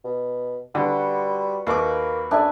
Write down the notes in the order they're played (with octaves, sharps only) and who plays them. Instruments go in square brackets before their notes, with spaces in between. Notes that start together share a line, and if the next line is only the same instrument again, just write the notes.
[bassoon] B2
[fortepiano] D3 [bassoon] G3 [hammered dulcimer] F#4 B4
[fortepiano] D#2 D6 [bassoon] A#3 [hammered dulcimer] B4 C#6
[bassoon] F#2 [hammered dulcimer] D4 E5 G#5